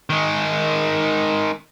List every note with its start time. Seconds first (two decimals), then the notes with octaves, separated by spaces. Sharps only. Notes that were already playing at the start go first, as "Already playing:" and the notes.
0.10 D#3 G#3